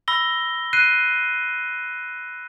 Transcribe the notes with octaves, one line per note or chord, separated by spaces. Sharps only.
B5 E6 A#6 G7
F#6 C7 D#7